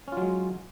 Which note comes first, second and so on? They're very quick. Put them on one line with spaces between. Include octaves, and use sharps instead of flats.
C#4 F4 F#3 G#3